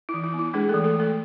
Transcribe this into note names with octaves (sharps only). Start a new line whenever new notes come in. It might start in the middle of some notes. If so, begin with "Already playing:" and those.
E4
E3
E4
B3 E4
G#3 D4 G#4
E3 A3 A4
A3 A4
E3 A3 A4